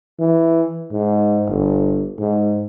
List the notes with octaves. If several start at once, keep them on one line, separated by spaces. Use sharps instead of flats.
E3
G#2
G1
G#2